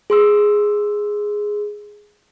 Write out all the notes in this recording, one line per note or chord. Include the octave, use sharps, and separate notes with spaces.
G#4 C6 E6